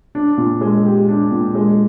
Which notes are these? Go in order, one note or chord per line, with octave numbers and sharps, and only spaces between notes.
D4
A#2
G#3
G4
D4
A#2
G#3